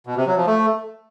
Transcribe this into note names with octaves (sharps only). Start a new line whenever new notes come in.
B2
C3
F#3
F3
A3